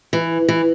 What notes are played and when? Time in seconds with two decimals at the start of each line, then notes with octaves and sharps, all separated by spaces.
0.13 E3
0.49 E3